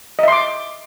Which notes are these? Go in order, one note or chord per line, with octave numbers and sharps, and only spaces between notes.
D#5 E5 C6 D6